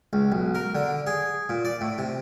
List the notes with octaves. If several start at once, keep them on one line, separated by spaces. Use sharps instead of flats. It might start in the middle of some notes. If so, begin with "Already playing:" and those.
C#2
B1
A#4
D3
G#4
A#2
D5
A2
C3